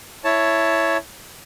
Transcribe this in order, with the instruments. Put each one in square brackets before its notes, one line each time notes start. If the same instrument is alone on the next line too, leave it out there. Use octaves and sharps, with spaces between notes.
[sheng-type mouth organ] E4 C#5 A5